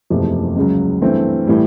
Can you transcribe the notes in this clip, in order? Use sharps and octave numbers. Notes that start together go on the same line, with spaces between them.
F#1 E2 C3 F3 A3
C#2 C#3 F#3
G2 E3 A3 C4
A2 E3 G3